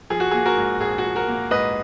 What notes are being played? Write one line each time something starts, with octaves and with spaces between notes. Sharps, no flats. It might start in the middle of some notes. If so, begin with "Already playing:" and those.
F3 G#4
F#4
A#3 G#4
F#4 A#4
G#2
A#1 G#4
F#4
F3
F#4 A#4
A#3
G#2 B4 D#5